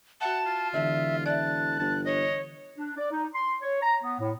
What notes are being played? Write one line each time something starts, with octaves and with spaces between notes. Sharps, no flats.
F#4 E5 F#5 A5
F4
E1 D3 E3 E5
D5 E5 A5 F#6
G1 A5
C#5 D#5
D4
D5
D#4
C6
C#5
A#5
B3
A2